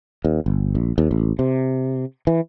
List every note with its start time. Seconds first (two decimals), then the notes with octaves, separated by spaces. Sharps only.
0.25 D#2
0.46 G1
0.75 A#1
0.98 D#2
1.11 A1
1.39 C3
2.27 E3